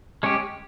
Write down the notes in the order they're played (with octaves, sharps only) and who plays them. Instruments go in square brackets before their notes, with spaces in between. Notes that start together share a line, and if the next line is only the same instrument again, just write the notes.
[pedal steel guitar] G#3 C#4 G4